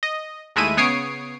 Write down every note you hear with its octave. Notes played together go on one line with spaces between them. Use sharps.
D#5
D#2 G#3 A3 E4 E5 D#7
C#3 B3 C#5 D#6 C7 D7